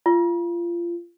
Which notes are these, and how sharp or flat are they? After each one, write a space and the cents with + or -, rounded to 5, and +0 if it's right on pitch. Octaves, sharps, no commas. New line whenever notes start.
F4 -25